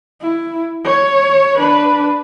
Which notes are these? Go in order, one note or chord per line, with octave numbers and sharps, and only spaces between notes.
E4
C#5
D4 B4